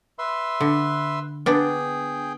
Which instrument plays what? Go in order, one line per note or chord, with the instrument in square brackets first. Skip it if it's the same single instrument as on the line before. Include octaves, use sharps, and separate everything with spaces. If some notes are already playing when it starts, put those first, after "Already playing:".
[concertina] B4 E5 C6
[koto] D3
[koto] B3 D4 [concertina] G#4 G5